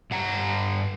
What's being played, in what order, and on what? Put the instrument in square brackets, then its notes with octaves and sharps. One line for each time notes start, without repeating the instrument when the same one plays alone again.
[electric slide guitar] G2 F#5 A#5